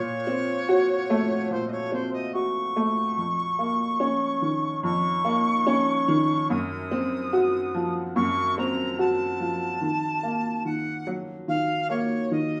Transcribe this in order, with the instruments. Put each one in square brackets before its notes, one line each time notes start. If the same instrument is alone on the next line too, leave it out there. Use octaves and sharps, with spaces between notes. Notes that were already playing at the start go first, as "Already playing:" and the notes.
Already playing: [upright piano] A#2 [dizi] C#5
[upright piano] C4
F#4
A3
[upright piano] A#2 [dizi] C5
[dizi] D#5
C#5
[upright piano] C4 [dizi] C5
[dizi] D#5
[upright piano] F#4 [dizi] C#6
[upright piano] A3
F2
A#3
C#4
D#3
[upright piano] F2 [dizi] C#6
[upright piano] A#3
C#4
D#3
[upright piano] F#2 [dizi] D#6
[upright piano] C4
F#4
F3
[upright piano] F#2 [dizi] C#6
[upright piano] C4 [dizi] A#5
[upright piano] F#4 [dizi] A5
[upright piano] F3
D#3
A#3
[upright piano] D#3 [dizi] F#5
[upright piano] F#3
[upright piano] D#3 [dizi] F5
[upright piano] A#3 [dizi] C#5
[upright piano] D#3 [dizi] D#5